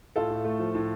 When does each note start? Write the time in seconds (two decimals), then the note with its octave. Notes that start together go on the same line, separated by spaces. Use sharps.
0.16 A2 F4 A4
0.30 A2
0.44 A3
0.59 F3
0.75 A2